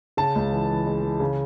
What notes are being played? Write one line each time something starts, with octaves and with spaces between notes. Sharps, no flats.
C#3 A5
C#2
E3
E3
G#3
E3
C#3